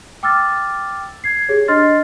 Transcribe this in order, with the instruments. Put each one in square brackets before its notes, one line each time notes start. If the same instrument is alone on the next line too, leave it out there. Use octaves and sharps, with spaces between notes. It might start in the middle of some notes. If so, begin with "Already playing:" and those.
[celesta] G5 D6 E6 F6 A6
G#6 C7
G4 G#4 C#5
D4 D#5 C6 F6 A6 C7